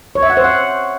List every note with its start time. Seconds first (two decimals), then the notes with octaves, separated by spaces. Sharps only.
0.15 C#5
0.23 E5
0.30 F#5
0.37 C5
0.44 F#5